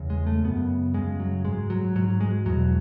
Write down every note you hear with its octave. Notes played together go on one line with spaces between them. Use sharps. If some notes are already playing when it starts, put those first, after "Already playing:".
Already playing: E2 C#3
G#3
A3
F#2 C#3 B3
F#2 C#3 G#3
F#3
G#2 G#3
F#3
G#2 F#3
G#3
E2 B2 F#3